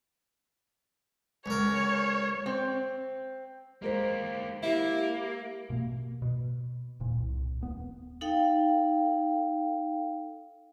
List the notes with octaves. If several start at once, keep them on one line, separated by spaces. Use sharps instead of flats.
C#2 A#4 C#5
C4
G#3 A#3 G4 A#4 C5
A#3 E4 G4
B2 A#3
B2
D#1 A#2
C2
D#1 B3
D#4 A4 F5 G5